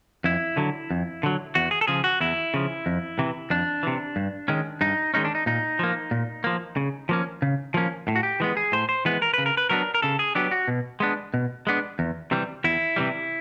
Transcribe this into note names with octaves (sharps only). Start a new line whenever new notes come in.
F2 E4
D3 F#3
F2
D3 F#3
E2 F#4
G#4
A4
C#3 F3 G#4
F#4
E2 E4
C#3 F3
F2
C3 E3
F2 D4
C3 E3
G2
D#3 G#3 C#4
G2 D#4
D#3 G#3 C#4 D#4
D4
D#4
A#2 D#4
F3 A#3
A#2
F3 A#3
C#3
F3 A#3 C#4
C#3
F3 A#3 C#4
A2
F#4
G4
E3 G#3 B3
G#4
A2 C5
C5
E3 G#3 B3 B4
A#4
C#3 B4
A#4
B4
F#3 B3 D4 A#4
A#4
C#3 A4
G#4
F#3 B3 D4 G4
F#4
B2
G#3 B3 D4
B2
G#3 B3 D4
E2
C3 E3 G3
E2 E4
C3 E3 G3